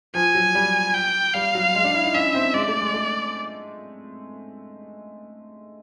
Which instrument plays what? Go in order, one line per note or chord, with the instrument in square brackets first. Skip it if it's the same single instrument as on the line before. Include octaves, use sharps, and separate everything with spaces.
[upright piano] F3 [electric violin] G#5
[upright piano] F#3
G3
[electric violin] G5
[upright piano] G3 [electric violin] F5
[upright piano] F#3
G#3
D4
E4
D#4
[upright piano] C#4 [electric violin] E5
[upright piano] C4
[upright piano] G#3 [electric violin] D5
[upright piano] A3
G#3
A3